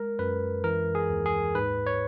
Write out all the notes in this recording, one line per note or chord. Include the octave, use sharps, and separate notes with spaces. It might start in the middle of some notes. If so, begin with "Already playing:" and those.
Already playing: G#3 A#4
F#2 B4
E3 A#4
G#4
D#2
G#4
G#2 B4
C#5